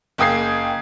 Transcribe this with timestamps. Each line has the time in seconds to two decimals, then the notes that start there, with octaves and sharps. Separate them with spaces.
0.18 F#1 A#3 G5 D#6 G#6 C7